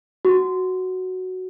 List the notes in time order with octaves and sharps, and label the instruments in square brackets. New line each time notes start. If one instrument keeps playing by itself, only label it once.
[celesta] F#4